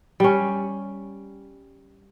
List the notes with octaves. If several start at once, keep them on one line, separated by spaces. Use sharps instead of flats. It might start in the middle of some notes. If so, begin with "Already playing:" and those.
G3 C#4